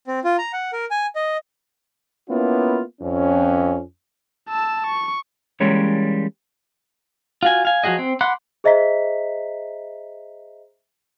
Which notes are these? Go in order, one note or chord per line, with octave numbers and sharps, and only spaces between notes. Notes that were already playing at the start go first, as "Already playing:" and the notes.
C4
F4
A#5
F#5
A#4
G#5
D#5
A#3 B3 C#4 E4 F4
F2 C#4
A5 E6
C#6
E3 G3 G#3 A#3 C#4 C#5
F4 F#4 G#5
F5 G#5
F3 F#3 F#4 G#4 D#5
C4
F#5 B5 C6 D6 F#6
G#4 C5 D#5 E5 A#5 B6